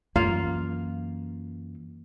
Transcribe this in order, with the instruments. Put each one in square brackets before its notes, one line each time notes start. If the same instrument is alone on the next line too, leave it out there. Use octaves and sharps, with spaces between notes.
[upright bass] F#2 E3 [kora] A#3 F4 F5